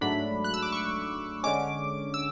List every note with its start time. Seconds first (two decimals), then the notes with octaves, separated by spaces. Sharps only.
0.01 G#2 F#3 A3 D4 B5
0.44 F#6
0.54 E6
0.62 D6
0.72 C#6
1.44 D3 G#3 C#4 D6
2.14 E6